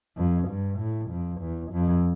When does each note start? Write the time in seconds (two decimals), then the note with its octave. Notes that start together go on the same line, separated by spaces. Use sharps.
0.17 F2
0.48 G2
0.79 A2
1.10 F2
1.40 E2
1.72 F2